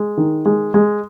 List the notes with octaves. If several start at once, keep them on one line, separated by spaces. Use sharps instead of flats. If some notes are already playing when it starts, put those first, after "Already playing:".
Already playing: G#3
D#3
G#3
G#3